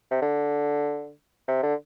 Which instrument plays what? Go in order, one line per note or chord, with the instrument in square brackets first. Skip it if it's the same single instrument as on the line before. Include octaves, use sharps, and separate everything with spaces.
[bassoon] C3
D3
C3
D3